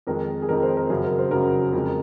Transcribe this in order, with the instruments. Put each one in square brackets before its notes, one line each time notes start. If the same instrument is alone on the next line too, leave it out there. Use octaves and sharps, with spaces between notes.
[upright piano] F2 D#3 G#3 A#4
G#4
F2 D#3 G#3 A#4
C5
A#4
F#2 C#3 F#3 G#4
A#4
C5
F#2 C#3 F#3 A#4
F2 C#3 G#3